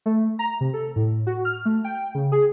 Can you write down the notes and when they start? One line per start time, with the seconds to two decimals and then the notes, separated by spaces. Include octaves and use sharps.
0.06 A3
0.39 A#5
0.61 C3
0.73 A4
0.96 A2
1.27 F#4
1.45 F6
1.65 A3
1.84 G5
2.15 C#3
2.32 G#4